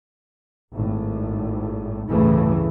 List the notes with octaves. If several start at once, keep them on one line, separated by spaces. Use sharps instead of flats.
G#1 A2
G1 D2 A2 C#3 E3 A3